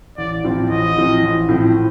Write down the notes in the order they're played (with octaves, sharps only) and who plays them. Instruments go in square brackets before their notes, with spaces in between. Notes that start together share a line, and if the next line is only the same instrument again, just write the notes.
[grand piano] A1 [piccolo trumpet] D5
[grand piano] A2 F3 C4
[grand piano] A1 [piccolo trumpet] D#5
[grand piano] A2 F3 C4
A1
A2 F3 C4